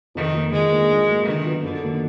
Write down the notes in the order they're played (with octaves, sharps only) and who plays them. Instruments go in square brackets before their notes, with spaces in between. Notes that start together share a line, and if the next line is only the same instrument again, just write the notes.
[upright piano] F2 [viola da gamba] D#3
[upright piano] F3 A#3
[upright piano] D#3 [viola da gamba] G#3
[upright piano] A#3 D4 F4
G#2
F#3 A#3
[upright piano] D3 [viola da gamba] D#3
[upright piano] F#3 B3 F4
[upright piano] F#2 [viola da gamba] D3
[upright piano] D#3 A#3 D#4 F#4